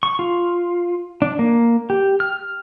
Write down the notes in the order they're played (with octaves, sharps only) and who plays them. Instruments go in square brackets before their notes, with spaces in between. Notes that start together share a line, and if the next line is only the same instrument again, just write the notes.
[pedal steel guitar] C#6
F4
D4
A#3
G4
F6